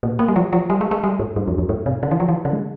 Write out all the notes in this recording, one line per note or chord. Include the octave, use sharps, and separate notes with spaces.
A#2
A#3
G3
F3
F3
G3
G#3
G#3
G3
G#2
G2
F2
F2
G#2
C3
C#3
E3
F3
E3
C#3
G#3